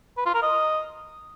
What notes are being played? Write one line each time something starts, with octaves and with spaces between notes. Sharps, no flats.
B4
F4
A#4
D#5